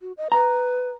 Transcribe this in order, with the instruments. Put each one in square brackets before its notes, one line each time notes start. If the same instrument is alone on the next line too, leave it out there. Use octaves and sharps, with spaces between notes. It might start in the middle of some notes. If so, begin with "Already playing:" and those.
[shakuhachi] F#4
D#5
[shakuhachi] B4 [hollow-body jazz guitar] A#5